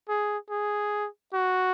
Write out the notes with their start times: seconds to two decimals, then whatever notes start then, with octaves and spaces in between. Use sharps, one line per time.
0.09 G#4
0.50 G#4
1.34 F#4